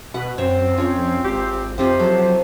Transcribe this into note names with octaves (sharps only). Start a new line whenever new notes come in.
B2 B4 F#5
F#2 C4 C5 C#5
F2 C#4 F4 C#5
G#1 G4
F2 C3 C4 D#4 F4 G4 C5
F3 F#3 A4